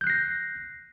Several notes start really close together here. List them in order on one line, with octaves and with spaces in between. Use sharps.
G6 F#6 C7 A#6